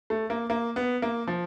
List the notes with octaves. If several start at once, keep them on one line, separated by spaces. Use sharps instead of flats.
A3
A#3
A#3
B3
A#3
F3